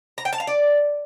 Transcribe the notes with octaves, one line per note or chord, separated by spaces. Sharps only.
A#5
G5
A5
F5
D5